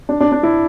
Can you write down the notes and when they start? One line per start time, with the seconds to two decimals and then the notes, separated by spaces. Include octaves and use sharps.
0.09 D4
0.21 D4
0.32 D4
0.43 E4